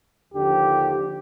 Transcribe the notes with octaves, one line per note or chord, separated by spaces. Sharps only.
D#2 D3 F3 G4